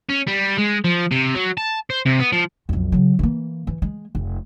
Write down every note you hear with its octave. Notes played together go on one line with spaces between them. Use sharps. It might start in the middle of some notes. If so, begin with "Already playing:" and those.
C#4
G3
G#3
F3
C3
F#3
A5
C5
C3
B3
F3
B1 F2
C#3 F#3
E3 A#3
E3
G#3
F1